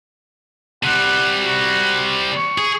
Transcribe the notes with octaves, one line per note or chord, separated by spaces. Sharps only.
C3 G3 F#5
F#4
C#6
G#4